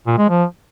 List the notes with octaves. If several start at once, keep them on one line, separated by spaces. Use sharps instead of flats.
A#2
G#3
F3